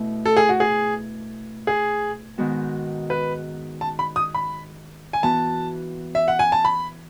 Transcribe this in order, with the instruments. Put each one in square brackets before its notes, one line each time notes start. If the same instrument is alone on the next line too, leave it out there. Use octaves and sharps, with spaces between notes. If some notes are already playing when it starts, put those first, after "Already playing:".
Already playing: [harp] B2 A3 E4
[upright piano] A4
G#4
F#4
G#4
G#4
[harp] G#2 D#3 G#3 B3 F#4
[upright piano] B4
A5
B5
D#6
B5
G#5
[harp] E3 B3 F#4 B4 [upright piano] A5
[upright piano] E5
F#5
G#5
A5
B5